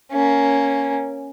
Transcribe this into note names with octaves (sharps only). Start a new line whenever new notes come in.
A#3 C#4